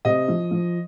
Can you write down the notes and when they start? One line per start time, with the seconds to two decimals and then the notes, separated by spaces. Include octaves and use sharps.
0.05 C3 D#5
0.28 F3
0.51 F3